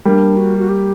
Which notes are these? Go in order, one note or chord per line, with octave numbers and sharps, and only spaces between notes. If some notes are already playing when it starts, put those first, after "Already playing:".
G3 A#3 D4
F#4
F#4
G4